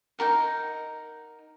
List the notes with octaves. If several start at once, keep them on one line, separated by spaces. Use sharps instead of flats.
D#4 F#4 A#4 F#5